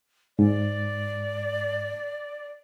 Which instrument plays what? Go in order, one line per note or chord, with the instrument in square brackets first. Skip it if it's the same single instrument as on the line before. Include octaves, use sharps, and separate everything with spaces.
[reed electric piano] G#2 [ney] D5